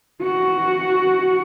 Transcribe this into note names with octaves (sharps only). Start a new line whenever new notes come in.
F#4